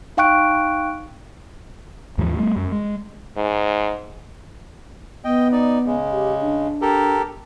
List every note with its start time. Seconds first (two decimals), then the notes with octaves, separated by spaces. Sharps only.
0.17 D#4 F5 G5 C#6 F#6 D7
2.18 D#2 G#2 E3 F3
2.38 G3 A3
2.56 F#2
2.72 G#3
3.37 G#2
5.24 B3 D#5 G5
5.52 D#4 D5
5.86 C#3 G#3
6.12 G4
6.41 D4
6.82 G4 A4 A#4